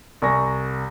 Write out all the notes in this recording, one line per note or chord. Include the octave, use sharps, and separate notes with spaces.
C2 G#5 C#6 A#6